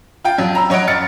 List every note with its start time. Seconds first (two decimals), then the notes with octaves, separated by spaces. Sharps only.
0.24 F4 G5
0.38 F2 F#3
0.55 A#5 B5 E6
0.70 F#3 C#5 D#5 F#5 D7
0.87 F#2 F6 A6 C#7